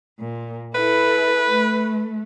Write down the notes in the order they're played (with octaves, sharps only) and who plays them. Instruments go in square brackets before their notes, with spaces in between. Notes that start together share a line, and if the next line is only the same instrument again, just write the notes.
[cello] A#2
[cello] E4 A4 [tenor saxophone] B4
[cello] A3